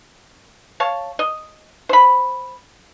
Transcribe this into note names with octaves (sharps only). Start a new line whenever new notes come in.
C#5 F5 A5
D#5
C5 B5